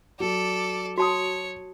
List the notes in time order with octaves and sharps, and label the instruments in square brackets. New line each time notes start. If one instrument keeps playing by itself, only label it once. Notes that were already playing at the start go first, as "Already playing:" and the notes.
[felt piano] F#3 [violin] A4 D5
[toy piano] F#4 A5 D#6 [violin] C#5